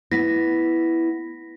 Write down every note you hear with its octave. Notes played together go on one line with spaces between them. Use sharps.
B3 E4 A#6 B6